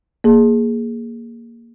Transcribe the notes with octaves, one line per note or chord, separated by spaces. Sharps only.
A#3 G#4